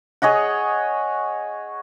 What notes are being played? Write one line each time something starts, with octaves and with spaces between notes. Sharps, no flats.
G#4 C#5 D#5 F#5